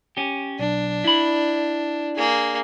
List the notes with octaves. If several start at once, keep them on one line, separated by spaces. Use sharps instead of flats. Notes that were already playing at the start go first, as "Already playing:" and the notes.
C#4 G4
B1 D4
E4 B5
A#3 G#4